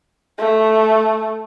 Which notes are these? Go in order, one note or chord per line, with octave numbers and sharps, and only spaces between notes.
A3